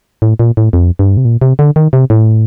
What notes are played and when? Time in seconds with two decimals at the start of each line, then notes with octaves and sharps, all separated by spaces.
0.22 A2
0.39 A#2
0.57 A2
0.73 F2
0.99 G2
1.17 C3
1.25 A#2
1.41 C3
1.59 D3
1.76 D#3
1.93 C3
2.10 A2